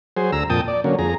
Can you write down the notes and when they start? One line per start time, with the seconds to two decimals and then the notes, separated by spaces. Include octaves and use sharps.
0.17 F#3 G#4 C5
0.32 D2 A#5 E6
0.50 F2 A#2 G5 A5 D#6
0.68 D5
0.84 D3 F#3 A#3 C#4
0.99 F2 G#4 A#5